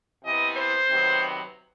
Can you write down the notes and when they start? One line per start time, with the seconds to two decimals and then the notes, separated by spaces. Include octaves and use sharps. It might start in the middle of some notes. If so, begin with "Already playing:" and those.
0.23 C3 E3 B3 D#5
0.56 C5
0.88 C3 D#3 F#3 B3